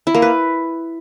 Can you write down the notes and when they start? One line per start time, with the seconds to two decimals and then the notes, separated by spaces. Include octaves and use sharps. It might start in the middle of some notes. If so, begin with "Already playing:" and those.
0.07 E4
0.15 A#3
0.22 B4